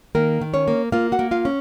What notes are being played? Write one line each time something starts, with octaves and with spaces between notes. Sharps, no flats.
D#3 A#3 A#4
D#3
C#4 C#5
A#3
A#3 F4 F5
F#4 F#5
A#3
F4 F5
C#4